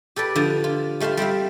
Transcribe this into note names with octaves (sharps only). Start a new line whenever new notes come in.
G4 A4 B4 D5
D3 F3
F4
G3 A3 F5 A5 C6
G3 C4 E5 F5